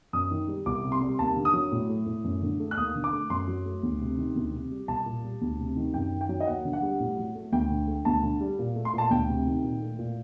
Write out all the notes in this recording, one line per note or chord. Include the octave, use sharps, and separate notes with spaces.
F#2 D#6
D#3
G3
C2 D6
C3
C6
G3
D#2 A5
D3
D#6
F#3
A2
A3
A2
F#2
D3
A3
F#6
D#2 D#6
D3
D6
A3
F#2 C6
F#3
A3
D2
C3
D#3
D2
C3
G3
C2 A5
A#2
G3
D2
C3
D#3
F#2 G5
D#3
G5
F#3
D#5
D#2 F#5
D3
F#5
G3
A2
F#3
A3
D2 G5
D3
A3
D2 A5
D3
G3
A#2
A3
C6
A#2
A5
D2 G5
C3
D#3
A#2
A3
A#2